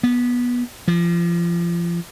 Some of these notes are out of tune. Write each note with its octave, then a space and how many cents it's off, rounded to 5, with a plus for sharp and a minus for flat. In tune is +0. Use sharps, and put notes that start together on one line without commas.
B3 -20
F3 -30